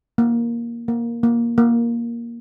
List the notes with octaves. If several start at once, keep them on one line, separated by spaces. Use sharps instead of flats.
A#3
A#3
A#3
A#3